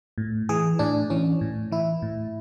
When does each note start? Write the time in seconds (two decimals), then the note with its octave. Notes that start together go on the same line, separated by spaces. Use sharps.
0.18 A2
0.49 E3 G#4
0.79 A2 D4
1.10 E3 C#4
1.41 A2
1.71 E3 E4
2.02 A2